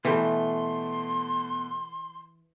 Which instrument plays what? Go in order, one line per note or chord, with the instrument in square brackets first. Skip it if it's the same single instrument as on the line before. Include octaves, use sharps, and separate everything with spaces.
[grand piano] B2 A3 [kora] E3 G5 [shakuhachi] C6